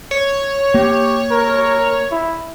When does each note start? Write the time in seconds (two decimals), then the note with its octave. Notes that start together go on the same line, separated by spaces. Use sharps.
0.11 C#5
0.74 A#3 G4
1.31 A#4
2.12 E4